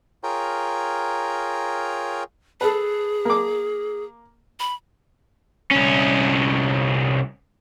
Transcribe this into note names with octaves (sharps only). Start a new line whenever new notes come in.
F4 G#4 A#4 C#5 G5 A#5
G#4 A4 B4
A#3 D6
B5
C2 C#4